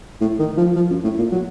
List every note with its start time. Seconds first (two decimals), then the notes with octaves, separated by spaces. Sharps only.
0.21 A2
0.39 D#3
0.57 F3
0.76 F3
0.91 F#2
1.04 A2
1.19 A#2
1.32 F#3